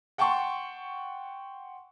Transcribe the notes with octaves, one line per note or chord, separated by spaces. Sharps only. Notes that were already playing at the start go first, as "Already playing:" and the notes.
F#5 G5 A5 C6 C#6